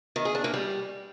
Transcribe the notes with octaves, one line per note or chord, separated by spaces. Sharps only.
D#3
G#4
D4
A#3
G3